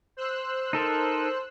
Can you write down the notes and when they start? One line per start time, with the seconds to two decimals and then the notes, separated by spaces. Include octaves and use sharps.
0.17 C5 E6 F#6
0.73 D#4 A4 A#4